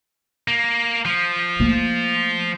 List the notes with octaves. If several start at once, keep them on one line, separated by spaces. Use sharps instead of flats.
A#3
F3
A3 A#3